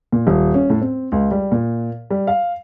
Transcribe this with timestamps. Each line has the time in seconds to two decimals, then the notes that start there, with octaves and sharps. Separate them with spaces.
0.12 A#2
0.27 D#1
0.54 C#4
0.70 A2
0.82 C4
1.12 C#2
1.31 G3
1.52 A#2
2.10 G3
2.27 F5